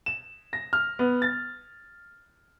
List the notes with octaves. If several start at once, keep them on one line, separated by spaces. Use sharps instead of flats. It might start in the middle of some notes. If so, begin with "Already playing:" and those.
E7
A#6
F6
B3
A6